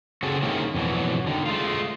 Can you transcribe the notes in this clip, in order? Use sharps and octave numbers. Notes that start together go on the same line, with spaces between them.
C#3 C4 F#4 G#4 A4
D#3 G#3 A#3 C4 C#4 E4
F2 B2 E3 F#3
D3 D#3
G#3 A3 F4